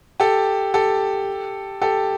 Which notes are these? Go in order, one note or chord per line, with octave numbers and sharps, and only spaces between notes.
G4 A4
G4 A4
G4 A4